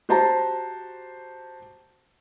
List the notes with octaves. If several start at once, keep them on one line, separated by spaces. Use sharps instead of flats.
F#4 G4 C5 A5 A#5